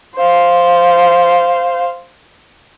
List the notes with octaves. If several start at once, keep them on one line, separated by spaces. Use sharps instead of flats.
C5 F5